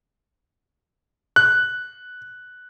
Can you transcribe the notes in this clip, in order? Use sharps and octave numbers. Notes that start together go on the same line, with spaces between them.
F#6